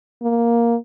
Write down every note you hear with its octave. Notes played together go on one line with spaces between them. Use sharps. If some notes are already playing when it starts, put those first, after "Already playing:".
A#3